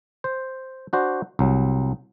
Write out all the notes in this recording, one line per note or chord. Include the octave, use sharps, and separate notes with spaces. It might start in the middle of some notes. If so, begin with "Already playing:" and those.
C5
D4 F#4 C5
C2 F#3